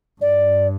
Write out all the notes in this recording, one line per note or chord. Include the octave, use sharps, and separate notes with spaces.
G2 D5